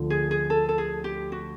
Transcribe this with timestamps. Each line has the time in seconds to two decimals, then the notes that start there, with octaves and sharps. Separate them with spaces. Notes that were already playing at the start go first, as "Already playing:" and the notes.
Already playing: D2 D3 F3
0.10 G#4
0.31 G#4
0.50 A4
0.69 A4
0.78 G#4
1.04 G4
1.32 F#4